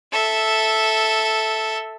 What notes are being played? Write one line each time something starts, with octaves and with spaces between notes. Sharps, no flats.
A4 E5